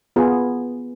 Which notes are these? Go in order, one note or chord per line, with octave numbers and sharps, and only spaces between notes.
B3 F4 G#4